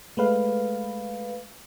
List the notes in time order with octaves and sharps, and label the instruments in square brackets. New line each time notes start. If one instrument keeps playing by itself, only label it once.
[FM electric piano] G#3 A3 B4 F5